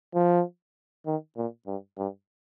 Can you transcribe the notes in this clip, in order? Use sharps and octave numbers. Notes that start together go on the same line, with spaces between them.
F3
D#3
A#2
G2
G2